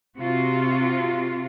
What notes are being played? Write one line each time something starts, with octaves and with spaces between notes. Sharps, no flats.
C3 F4 F#4